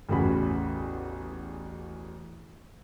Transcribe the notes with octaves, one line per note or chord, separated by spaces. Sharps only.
A1 E2 C#3 F#4 B5